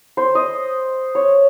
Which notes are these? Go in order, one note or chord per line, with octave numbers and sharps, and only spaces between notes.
C5
D#5
C#5